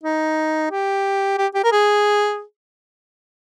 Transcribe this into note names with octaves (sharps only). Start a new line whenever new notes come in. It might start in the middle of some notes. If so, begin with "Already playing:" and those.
D#4
G4
G4
G4
A#4
G#4